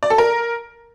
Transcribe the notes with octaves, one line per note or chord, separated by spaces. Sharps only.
D5
A4
A#4